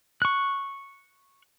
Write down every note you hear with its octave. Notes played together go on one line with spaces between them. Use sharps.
C#6 F#6